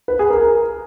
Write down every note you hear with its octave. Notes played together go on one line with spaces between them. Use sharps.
B4
G#4
A#4
A#4